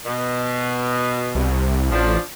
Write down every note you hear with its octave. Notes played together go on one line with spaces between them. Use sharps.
B2
C2
A1 F3 D4